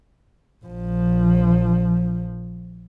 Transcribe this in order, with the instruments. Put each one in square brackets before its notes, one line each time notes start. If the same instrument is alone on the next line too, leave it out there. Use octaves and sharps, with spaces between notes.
[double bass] A#1 F3